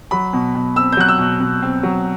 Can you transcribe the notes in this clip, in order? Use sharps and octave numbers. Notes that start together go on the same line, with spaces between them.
F#3 B5
B2
B2
C4 E6
G6
F#3 F#6
E6
B2
B2
C4
F#3